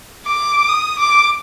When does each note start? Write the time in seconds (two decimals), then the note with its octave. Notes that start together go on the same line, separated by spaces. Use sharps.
0.27 D6
0.69 D#6
0.99 D6